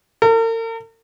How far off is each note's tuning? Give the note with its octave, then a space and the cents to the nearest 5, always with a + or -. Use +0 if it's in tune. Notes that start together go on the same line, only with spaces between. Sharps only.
A#4 -45